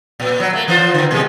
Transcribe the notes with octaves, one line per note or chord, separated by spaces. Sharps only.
A#2
F#3
A3 A#3
E3 F4 C5
D3 E3
B2 G#3